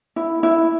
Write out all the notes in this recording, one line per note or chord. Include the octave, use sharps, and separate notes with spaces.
E4
E4